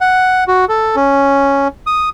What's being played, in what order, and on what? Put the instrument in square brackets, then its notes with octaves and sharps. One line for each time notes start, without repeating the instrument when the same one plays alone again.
[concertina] F#5
F#4
A4
C#4
D#6